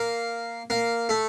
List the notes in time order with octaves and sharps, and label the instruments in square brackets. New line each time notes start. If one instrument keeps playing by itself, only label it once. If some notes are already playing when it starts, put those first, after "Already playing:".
Already playing: [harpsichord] A#3
A#3
A3